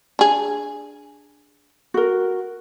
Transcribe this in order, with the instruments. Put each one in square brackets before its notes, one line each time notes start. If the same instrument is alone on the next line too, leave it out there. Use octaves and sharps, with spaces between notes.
[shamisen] D4 G#4
[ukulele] F#4 A#4